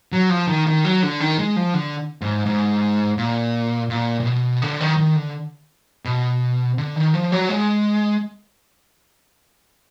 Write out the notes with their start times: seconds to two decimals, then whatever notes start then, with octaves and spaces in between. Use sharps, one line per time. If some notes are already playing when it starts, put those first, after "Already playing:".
0.12 F#3
0.30 F3
0.48 D#3
0.67 D#3
0.85 F#3
1.03 D3
1.20 D#3
1.38 G#3
1.56 F3
1.74 D3
2.21 G#2
2.46 G#2
3.18 A#2
3.90 A#2
4.20 A#2
4.26 B2
4.62 D3
4.80 D#3
4.97 D#3
5.16 D3
6.05 B2
6.78 D3
6.96 D#3
7.14 F3
7.32 F#3
7.49 G#3